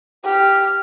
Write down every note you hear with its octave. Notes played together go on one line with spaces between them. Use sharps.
G4 F6